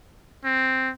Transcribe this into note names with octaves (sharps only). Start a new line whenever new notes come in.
C4